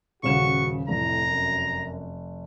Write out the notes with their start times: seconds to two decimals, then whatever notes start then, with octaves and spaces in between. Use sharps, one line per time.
0.23 D#1 C#3 F#4 C#6 E7
0.88 F1 A2 A#5
1.26 F#2